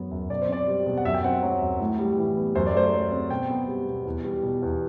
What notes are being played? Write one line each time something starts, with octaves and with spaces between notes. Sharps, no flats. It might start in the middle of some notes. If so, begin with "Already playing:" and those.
Already playing: F#2 F#3 B3
F#2
B2 D5
C5
C4 D5
G3
B2
F#5
F#2 E5
G5
C4 F#5
F#3
F#2
A2
G3
E3
B3
F#2 C5
D5
A3 C5
F#3
C4
B2 G5
B3
G3
B2
E2
G3
B2
E2